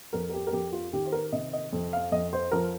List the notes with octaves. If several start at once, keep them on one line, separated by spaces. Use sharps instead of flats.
F2 A#4
A#4
G4
A#4
F2 G4
F4
D#3 G4
C5
A#4
C3 D#5
D#5
F2
F5
F2 D#5
C5
F3 A#4